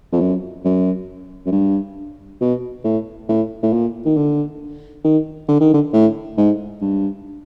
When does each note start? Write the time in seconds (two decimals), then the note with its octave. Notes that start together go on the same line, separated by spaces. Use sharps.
0.12 F2
0.21 F#2
0.65 F#2
1.46 F#2
1.52 G2
2.41 B2
2.84 A2
3.29 A2
3.63 A2
3.73 A#2
4.05 D#3
4.17 D3
5.04 D#3
5.48 D3
5.60 D#3
5.73 D3
5.93 A2
6.37 G#2
6.81 G2